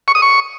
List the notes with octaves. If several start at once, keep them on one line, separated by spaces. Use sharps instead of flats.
C#6
D#6
C#6